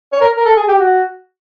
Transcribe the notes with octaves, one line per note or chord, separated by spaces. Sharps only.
C#5
A#4
A#4
A4
G#4
G4
F#4